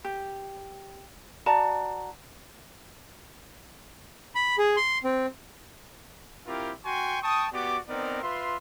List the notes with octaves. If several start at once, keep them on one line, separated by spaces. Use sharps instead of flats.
G4
F#4 D5 A5 A#5
B5
G#4
C6
C4
C4 E4 F4 G4 A#4
F#4 G5 G#5 C6 C#6
G5 A5 C#6 D#6
B3 F#4 G4 D5 D6
B3 C4 D#4 A#4 D5
F4 B4 E5 C6